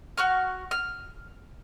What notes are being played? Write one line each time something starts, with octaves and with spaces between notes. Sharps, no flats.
F#4 C#6 F6
F6